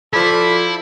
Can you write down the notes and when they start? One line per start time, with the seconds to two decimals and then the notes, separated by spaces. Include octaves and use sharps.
0.13 F3 E4 A4 D5 B5